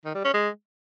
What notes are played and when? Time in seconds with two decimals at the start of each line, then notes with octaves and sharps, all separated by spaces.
0.05 D#3
0.15 G3
0.24 C#4
0.34 G#3